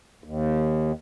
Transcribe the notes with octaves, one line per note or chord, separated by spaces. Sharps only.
D#2